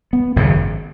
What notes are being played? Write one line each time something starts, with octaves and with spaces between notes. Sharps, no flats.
B3
G#1 F#2 C#3